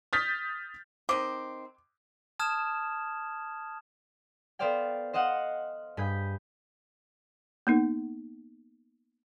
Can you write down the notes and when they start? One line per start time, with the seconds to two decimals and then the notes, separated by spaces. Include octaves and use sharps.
0.13 D#6 F6 G6 A6 B6
1.09 D#3 C4 D6
2.39 A5 D#6 F6 G#6 E7
4.59 B3 A4 C5 D5 F5 G5
5.13 C5 D#5 F5 F#5
5.97 G2 G#4 B5 G6
7.67 A#3 B3 D#4